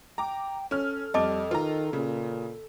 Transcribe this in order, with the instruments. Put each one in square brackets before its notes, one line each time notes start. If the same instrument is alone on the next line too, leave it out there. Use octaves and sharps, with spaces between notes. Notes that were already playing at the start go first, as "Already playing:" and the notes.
[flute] G5 [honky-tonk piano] A#5 D6
[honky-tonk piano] C#4 F6 [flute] A4
[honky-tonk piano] F2 [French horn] G3 [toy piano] D#5 A5 D6
[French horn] D#3 [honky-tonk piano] F4 A#5 [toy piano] B4
[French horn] A#2 [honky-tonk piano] C#3